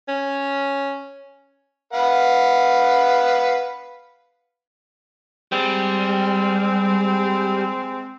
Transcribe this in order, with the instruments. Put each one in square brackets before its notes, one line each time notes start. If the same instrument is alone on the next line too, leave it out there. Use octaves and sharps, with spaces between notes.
[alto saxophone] C#4
[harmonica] B4 F5 F#5
[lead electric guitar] G3 [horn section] G#3 C4